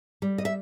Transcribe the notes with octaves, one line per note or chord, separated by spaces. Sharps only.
G3
D#5
E5